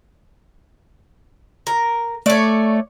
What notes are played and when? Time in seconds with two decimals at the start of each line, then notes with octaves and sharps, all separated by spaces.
1.67 A#4
2.26 A3 C#5 D5